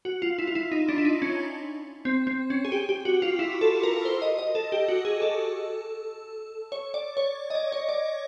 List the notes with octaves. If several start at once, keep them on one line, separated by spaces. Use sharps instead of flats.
F#4
F4
E4
F4
E4
D#4
D4
E4
D#4
C#4
C4
C4
C#4
G#4
G4
G4
F#4
F4
E4
A4
A#4
C5
D#5
D#5
A4
G4
F#4
G#4
A4
C#5
D5
C#5
D#5
D5
C#5
D5